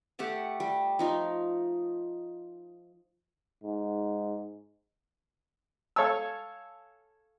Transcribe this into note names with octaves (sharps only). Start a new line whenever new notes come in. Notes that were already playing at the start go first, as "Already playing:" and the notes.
A3 G4 F#5 A5
G3
F3 D#4 F4
G#2
A4 C#5 F5 G#5 A5 E6